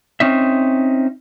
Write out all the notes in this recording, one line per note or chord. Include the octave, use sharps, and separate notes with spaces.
C4 C#4 D#4 E5